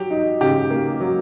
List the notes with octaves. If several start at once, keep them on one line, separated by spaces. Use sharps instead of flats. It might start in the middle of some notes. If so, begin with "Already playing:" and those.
Already playing: F#3 G4
D#4
C#3 G4
A#3
F#3